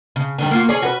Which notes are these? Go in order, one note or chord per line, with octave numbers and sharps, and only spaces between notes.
C#3
D3 D#3 G3
A#3 F4 F#4
C#4 G#4 D5
F#4 B4